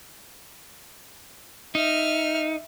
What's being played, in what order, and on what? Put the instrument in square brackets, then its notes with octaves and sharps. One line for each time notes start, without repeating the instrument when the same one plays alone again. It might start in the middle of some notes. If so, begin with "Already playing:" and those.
[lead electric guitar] D#4 [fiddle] E5 F6